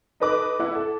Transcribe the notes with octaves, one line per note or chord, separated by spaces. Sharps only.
D#4 A4 B4 D#5 D6 F#6
E4 F#5
A4